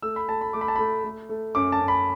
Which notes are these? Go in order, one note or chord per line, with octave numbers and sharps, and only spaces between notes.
A3 E6
B5
A3 A5
B5
A3 D6
B5
A5
A3 B5
A3
A3
F#2 D6
A5
F#2
B5